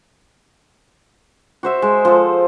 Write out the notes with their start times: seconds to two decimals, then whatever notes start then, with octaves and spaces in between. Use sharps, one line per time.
1.63 F#4 C5 E5
1.82 G#3
2.05 F3 A4